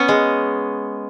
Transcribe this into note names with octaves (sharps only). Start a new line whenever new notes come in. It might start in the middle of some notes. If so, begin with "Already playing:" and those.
Already playing: B3 C#4
G#3